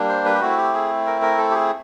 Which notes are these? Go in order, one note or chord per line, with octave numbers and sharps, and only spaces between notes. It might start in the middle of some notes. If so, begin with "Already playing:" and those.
Already playing: G3 A#3 D4
C5
B4
G4
A3 C4 E4 F#4
G4
G#4
A#4
A#4
A4
G4
G#4